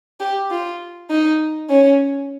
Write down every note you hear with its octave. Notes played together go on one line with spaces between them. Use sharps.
G4
F4
D#4
C#4